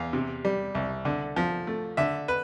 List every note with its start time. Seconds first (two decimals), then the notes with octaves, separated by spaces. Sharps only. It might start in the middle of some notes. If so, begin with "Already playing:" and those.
Already playing: E2 F5
0.13 C3
0.45 G3
0.75 C2
1.05 D3
1.36 F3
1.67 A3
1.97 D3 E5
2.28 B4